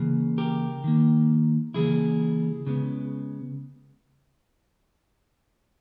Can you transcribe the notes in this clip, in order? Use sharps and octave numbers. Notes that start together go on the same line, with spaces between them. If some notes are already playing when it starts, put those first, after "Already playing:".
Already playing: C#3 E3 A#3
G4 A#4
D#3 A#3
C#3 E3 G3 A#3 E4 G#4
C#3 G#3 B3